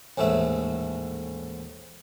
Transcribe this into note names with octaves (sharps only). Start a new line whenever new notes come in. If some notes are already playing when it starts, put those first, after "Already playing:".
A1 D#2 G#2 A3 E5